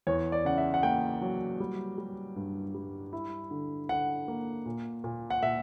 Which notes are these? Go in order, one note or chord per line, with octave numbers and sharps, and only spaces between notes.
E2 C#5
D5
C#3 F#5
E5
F#5
A#3 G5
F#3
G3
G3
G2
G3
E4
D3
D3 F#5
A#3
A#2
A#2
F#5
A#2 E5